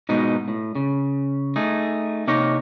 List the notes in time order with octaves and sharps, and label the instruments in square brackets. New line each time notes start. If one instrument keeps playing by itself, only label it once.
[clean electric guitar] G#2 B2 D#4
A2
C#3
A3 D#4 G#4
C3 A#3 D#4 C#5